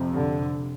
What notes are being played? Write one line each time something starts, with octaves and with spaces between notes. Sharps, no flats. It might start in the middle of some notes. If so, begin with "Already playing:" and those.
Already playing: F2 C3
D3